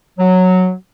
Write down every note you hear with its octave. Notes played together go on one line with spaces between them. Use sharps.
F#3